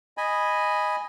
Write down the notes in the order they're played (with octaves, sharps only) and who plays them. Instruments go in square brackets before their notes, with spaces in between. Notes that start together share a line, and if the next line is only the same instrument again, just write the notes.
[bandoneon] D#5 G#5 B5